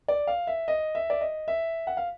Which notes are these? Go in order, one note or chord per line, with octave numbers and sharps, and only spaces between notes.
D5
F5
E5
D#5
E5
D5
D#5
E5
F#5
F5